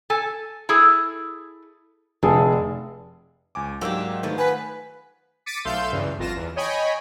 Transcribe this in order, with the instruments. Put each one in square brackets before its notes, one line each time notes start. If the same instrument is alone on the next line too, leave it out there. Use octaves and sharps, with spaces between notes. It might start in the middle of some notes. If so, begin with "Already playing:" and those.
[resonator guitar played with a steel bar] A4 G#5
E4 G#4 A4
[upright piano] F1 G#4 A5 [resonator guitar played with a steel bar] D3
[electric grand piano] C#2 G#5 D6
[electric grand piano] G#2 F#3 E6 [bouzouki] A#3 D4 G4
[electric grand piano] D#3 A3 [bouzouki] F3 B3
[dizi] B4 [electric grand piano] G#5
[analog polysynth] D6 A6 B6 C#7 D#7
B1 A3 F5 C6 E6 G6
D2 G2 C#3 E3
G1 F2 F4 A#6 E7
E2
C#5 D#5 G5 G#5 B5